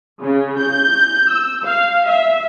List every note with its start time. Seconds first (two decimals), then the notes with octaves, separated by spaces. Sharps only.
0.21 C#3
0.58 G6
1.29 E6
1.64 F5
2.07 E5